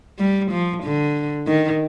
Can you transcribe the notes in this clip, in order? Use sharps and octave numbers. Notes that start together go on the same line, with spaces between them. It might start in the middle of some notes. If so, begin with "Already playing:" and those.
G3
F3
D3
D#3